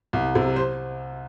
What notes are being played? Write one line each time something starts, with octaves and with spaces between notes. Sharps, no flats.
C2
C3
C5